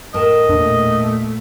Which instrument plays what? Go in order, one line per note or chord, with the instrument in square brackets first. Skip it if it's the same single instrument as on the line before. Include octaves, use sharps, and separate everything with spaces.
[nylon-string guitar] A2 A#4 A5 [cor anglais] D#5
[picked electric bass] E2 D4 [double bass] A#2 A3